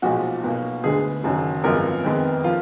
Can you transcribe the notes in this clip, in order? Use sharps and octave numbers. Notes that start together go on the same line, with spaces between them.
B1 A#2 F3 G#3 F#4
B1 B2 A#3
D2 D3 G#3 B3 G#4
F#1 F#2 D#3 F#3
G#1 F#2 F3 G#3 B3 A#4
F2 D#3 G#3 B3
F3 A#3 F4